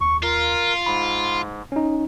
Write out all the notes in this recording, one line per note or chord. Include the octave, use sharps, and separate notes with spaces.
D#2 C#6
F4 A#4
G#2 B5
C#4 D#4